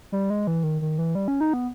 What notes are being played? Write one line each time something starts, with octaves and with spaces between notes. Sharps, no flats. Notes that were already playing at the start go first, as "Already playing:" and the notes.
G3
G#3
E3
D#3
D#3
E3
G3
C#4
D#4
B3